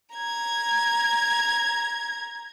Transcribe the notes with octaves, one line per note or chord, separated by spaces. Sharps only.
A#5 G#6